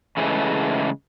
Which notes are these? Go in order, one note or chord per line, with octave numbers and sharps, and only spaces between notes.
C#3 E3 G#3 A3